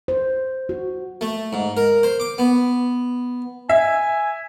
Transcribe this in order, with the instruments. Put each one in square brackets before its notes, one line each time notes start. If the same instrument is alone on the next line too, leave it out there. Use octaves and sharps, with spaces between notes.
[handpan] C5
F#4
[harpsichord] A3
G#2
A#4
C5
D6
B3
[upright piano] E5 [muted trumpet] G#5